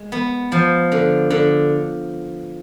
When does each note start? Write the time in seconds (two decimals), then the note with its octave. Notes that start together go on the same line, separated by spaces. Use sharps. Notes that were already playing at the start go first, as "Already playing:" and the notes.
Already playing: G#3
0.12 B3
0.52 F3
0.92 D3
1.30 D3